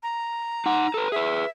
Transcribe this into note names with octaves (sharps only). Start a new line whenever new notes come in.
A#5
D#4 F#5
A4 B4
G#4 B4 E5